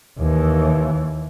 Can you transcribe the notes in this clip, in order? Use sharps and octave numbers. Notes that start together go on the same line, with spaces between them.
D#2 E3